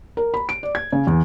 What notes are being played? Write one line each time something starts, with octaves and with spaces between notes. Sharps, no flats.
A#4
B5
D7
D5
G#6
C#3
E2